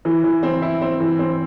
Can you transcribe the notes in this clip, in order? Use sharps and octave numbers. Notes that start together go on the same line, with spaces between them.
E3
E3
C4
E4
C4
E3
C4